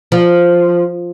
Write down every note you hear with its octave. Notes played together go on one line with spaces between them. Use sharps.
F3